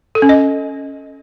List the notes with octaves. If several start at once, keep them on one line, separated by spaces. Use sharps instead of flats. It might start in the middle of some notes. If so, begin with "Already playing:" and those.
A4
C#4
D#5